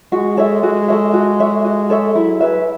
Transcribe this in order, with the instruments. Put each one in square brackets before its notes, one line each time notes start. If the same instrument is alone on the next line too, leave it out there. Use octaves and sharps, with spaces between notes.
[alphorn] G#3 [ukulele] F#4
[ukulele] A4 C#5 E5
[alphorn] G#3 [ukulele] F#4
[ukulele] A4 C#5 E5
F#4
A4 C#5 E5
F#4
A4 C#5 E5
[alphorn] F#3 [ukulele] E4
[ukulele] G#4 B4 E5